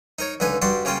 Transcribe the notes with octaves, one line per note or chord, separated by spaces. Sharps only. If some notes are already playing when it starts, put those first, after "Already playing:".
D#4 A#4 C#5
C#2 D3 D#4 B4 G#5
G2 G3 F#4 D5 C6
C#3 A#3 C#4 F4 G5